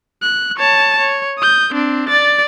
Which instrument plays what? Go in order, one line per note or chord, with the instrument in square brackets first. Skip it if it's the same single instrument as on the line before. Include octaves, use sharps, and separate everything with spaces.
[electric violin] F#6
C#5 A5
C#5
D#6 G6
C4 D4
D5 A6